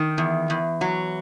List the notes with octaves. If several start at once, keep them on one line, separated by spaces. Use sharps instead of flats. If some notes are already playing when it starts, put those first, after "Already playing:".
Already playing: D#3
E2
E2
F#3